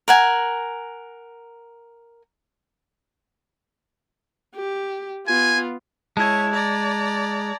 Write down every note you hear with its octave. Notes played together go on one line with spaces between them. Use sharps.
A#4 F#5 G#5
G4
B3 F4 G#5
G#3 E4 C#5 A5 G#6
D5 A#5